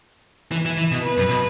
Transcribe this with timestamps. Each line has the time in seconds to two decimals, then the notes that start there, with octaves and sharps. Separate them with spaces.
0.52 E3
0.66 E3
0.77 E3
0.91 B2
1.03 B4
1.17 F#2
1.29 B2